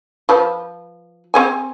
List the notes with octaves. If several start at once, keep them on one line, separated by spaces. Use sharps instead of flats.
F3 B4
C4 G#4 G#5